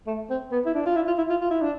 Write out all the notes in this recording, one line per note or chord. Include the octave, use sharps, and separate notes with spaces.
A3
C4
B3
E4
D4
F4
E4
F4
E4
F4
F4
E4
D4